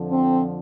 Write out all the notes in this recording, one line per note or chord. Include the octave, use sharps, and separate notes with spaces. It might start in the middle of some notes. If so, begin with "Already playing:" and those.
Already playing: F2 D3 F3
C4